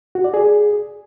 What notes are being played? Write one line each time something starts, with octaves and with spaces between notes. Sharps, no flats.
F#4
D5
G#4